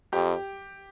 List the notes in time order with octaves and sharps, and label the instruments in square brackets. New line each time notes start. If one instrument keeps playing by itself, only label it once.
[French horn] F2 [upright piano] G4